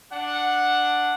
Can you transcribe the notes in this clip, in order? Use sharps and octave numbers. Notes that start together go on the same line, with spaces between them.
D4 F#5